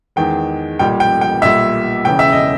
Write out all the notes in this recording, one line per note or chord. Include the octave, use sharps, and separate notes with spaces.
E2 D#3 G#3 G5
B1 A#2 G3 G5
G5
G5
B1 A#2 G3 E5
E1 E2 C#3 G5
E5
D#5